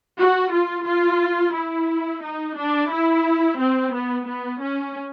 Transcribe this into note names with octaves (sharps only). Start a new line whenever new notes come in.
F#4
F4
F4
E4
D#4
D4
E4
C4
B3
B3
C#4